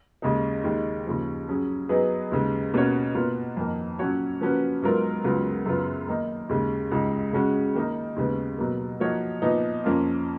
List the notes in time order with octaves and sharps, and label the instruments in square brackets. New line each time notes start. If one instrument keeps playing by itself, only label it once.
[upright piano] D#2 C#3 G#3 D#4
D#2 D#3 G#3
D#2 C#3 F3
F#3 C#4 G#4
F#3 B3 D#4 G#4 B4
D#2 C#3 G#3
B2 A#3 C#4 F#4 C#5
B2 A#3 F4 B4
F2 D#3 A#3
A#2 F#3 C#4 F#4 C#5
F3 A#3 C#4 F#4 B4
G#2 F#3 B3 F4 A#4
C#2 C#3 F#3 B3 F4
F#2 C#3 F#3 B3 F4
D#3 A#3 D#4
D#2 C#3 G#3
C#2 C#3 G#3 D#4
C#3 G#3 C#4 F#4
D#3 A#3 D#4
D#2 C#3 G#3 B3
B2 F#3 A#3
F3 A#3 D#4 F#4 C#5
A#2 F3 B3 D#4
F2 F3 A#3 C#4 F4